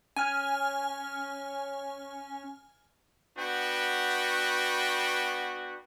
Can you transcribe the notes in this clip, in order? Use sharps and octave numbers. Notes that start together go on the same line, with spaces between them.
C#4 G#5 F6
B3 D4 F#4 B4 G5